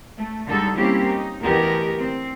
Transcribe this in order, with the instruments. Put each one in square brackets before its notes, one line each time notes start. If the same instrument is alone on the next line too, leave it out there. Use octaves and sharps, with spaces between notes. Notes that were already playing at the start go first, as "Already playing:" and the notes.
[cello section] A3
D3 G3 G#3 D#4 A4
G3 A#3 C4 C#4 E4 G4
D#4
D2 E3 B3 G4 A#4 D#5
C4